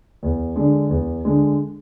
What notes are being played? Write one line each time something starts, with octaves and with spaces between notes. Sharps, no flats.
E2
D3 G#3 D4
E2
D3 G#3 D4